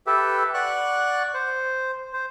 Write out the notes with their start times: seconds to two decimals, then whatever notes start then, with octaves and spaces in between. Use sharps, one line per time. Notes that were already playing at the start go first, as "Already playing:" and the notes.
0.07 G4 A4 B4 E5
0.54 D5 F#5 C#6 F#6
1.34 C5
2.14 C5